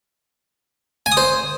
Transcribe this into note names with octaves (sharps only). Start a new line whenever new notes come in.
G#5
D#6
C5